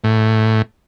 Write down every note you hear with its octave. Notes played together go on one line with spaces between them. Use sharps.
A2